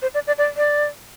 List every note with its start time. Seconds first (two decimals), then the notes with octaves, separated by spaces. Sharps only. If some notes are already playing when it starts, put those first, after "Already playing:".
0.02 C5
0.14 D5
0.27 D5
0.38 D5
0.57 D5